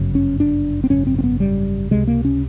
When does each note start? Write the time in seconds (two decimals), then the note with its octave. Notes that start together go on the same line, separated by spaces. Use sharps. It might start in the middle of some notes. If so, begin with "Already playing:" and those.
Already playing: G1 F#2 C#3
0.15 C#4
0.40 D4
0.84 C4
0.90 G#1 F#2 C#3 C#4
1.07 C4
1.19 C4
1.24 B3
1.40 G3
1.91 C#2 C3 G#3
2.07 A#3
2.25 C#4